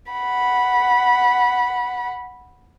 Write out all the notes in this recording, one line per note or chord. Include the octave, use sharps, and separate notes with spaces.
F#5 B5